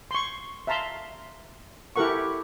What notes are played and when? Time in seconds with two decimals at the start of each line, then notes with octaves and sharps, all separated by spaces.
0.11 C6 C#6
0.67 E5 F5 A5 A#5 C6
1.96 E4 G4 A4 A#4 F#5 C#6